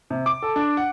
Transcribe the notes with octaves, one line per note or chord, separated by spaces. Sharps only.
C3
D6
A4
D4
F#5